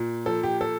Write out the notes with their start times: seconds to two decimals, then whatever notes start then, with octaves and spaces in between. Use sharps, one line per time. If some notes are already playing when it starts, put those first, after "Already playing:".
Already playing: A#2
0.26 F3 A4
0.43 G4
0.61 A4